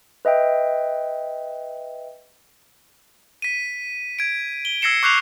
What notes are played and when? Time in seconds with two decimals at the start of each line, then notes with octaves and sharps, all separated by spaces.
0.25 B4 D#5 E5 G5
3.42 B6 D#7
4.19 G#6 D7
4.65 G7
4.82 E6 G#6 A#6 C7 C#7 E7
5.03 C#6 D6 F#6 G6 C7 F7